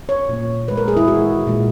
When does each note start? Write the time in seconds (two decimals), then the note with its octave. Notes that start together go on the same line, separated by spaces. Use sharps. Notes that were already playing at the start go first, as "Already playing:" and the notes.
0.09 C#5
0.29 A#2 A#3
0.68 D#3 G#3 B4
0.77 A#4
0.88 G#4
0.97 E4
1.07 D#3 G#3 F#4
1.47 A#2 G#3